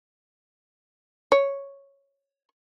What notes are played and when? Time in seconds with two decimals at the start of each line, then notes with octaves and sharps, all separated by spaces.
1.32 C#5